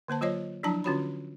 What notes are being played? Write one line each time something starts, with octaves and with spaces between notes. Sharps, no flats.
D3 A#3 C5 A5
F#3 F4 C5 C#5 D#5
F3 F#3 D4 E4 A5 A#5
D3 C#4 F4 F#4 C#5 B5